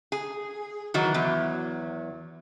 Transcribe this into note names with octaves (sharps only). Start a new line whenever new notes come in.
G#4
D#3 E3 F#3 F#4
E2 F#3